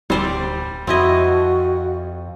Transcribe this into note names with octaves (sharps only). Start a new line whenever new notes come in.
D1 G3 C4 C5 D5
F2 C4 E4 F#4 D#5